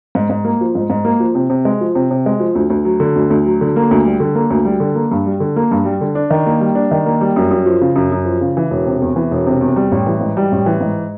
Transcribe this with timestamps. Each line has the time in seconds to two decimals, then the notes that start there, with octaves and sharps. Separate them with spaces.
0.15 G#2
0.30 G#2
0.45 A#3
0.61 F3
0.75 G#2
0.90 G#2
1.05 A#3
1.20 F3
1.35 C3
1.50 C3
1.65 G#3
1.81 F3
1.95 C3
2.11 C3
2.26 G#3
2.40 F3
2.55 D2
2.70 D2
2.85 F#3
3.00 D3
3.16 D2
3.30 D2
3.46 F#3
3.61 D3
3.76 A#3
3.91 D2
4.06 G3
4.20 D3
4.35 A#3
4.50 D2
4.65 G3
4.80 D3
4.95 A#3
5.11 G2
5.26 G3
5.40 D3
5.56 A#3
5.71 G2
5.85 G3
6.01 D3
6.15 D4
6.30 D#3
6.46 A#3
6.61 G3
6.75 D4
6.91 D#3
7.06 A#3
7.21 G3
7.36 F#2
7.51 F#2
7.66 F3
7.81 C#3
7.96 F#2
8.12 F#2
8.25 F3
8.41 C#3
8.57 E3
8.71 E1
8.87 C3
9.02 E2
9.16 E3
9.31 E1
9.46 C3
9.61 E2
9.76 G3
9.92 A1
10.07 E3
10.21 G#2
10.37 G3
10.52 A1
10.66 E3
10.81 G#2